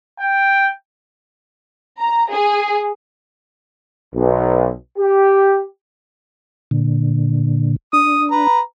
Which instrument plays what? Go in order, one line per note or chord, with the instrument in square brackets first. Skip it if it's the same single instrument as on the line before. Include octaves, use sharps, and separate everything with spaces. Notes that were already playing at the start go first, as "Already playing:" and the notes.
[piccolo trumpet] G5
[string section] A#5
G#4
[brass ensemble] B1
G4
[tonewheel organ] A#2 D3
[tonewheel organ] D4 [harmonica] D#6
[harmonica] B4 A#5